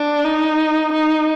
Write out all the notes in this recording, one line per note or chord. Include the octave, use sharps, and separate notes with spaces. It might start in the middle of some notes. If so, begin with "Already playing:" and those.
Already playing: D4
D#4
D#4